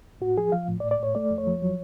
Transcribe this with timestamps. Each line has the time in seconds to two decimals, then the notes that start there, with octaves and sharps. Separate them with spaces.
0.21 A2 F#4
0.37 F3 G#4
0.52 F3 F5
0.68 A2
0.80 D5
0.83 A2
0.91 D5
0.99 A2 C#5
1.15 A3 D5
1.31 F2
1.38 C#5
1.47 F3
1.62 F#3